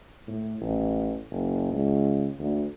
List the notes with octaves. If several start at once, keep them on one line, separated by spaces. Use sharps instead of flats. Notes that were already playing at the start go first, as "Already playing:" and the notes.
A2
A1
F#1
C#2
D2